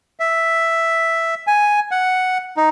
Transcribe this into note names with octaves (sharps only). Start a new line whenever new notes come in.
E5
G#5
F#5
D#4